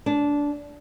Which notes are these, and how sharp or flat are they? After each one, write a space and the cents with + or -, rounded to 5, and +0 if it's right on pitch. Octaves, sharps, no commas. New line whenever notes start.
D4 -15